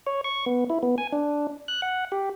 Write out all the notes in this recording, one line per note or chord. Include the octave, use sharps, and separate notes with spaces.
C#5
C#6
B3
E4
B3
G#5
D4
F#6
F#5
G4